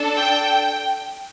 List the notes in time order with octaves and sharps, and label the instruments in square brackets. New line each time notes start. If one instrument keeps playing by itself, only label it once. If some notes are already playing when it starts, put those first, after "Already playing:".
Already playing: [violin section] D4 A4
G5
G5